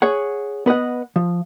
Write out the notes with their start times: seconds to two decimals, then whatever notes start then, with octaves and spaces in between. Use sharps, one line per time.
0.02 G#4 C#5 F#5
0.66 B3 B4 D#5 F#5
1.16 F3